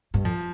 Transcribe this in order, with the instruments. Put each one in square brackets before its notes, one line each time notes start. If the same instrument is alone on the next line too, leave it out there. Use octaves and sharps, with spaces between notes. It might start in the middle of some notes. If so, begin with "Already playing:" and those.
[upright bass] G2
[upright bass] F2 [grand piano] F3